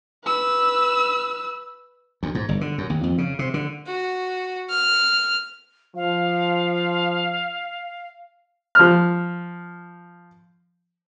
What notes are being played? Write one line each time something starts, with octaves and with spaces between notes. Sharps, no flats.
B4 E6
D2
G#2
G1
D3
F#2
D#2
F2
C#3
C3
D3
F#4
F6
F3 F5
F3 F6